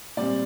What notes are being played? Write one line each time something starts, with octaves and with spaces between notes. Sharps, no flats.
A#2 G3 C4 D5